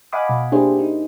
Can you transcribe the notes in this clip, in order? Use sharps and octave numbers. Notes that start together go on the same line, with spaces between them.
D#5 F5 F#5 G#5 B5 D6
B2
A#3 D4 E4 G4 G#4 C5
D#4